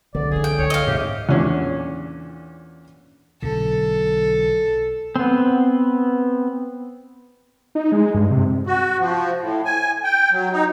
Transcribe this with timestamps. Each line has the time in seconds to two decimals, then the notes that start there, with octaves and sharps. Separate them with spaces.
0.15 C2 D3 D5
0.31 E3 C#4 G#4
0.44 G5
0.58 C#2 C#5
0.70 D#5 F5
0.87 G#2 C3 G4
1.29 E2 A#2 C#4 D4
3.42 B1 D3 A4
5.16 B3 C4
7.75 D#4
7.92 G#3
8.14 G2
8.30 C3
8.67 F#4
9.00 F3
9.40 A2
9.65 G#5
10.04 G5
10.31 F#3
10.52 D#4